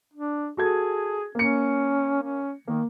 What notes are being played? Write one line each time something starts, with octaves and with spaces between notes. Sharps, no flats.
D4
F#4 G#4 A4 G#6
A#3 C#4 C#7
C#4
D#3 A#3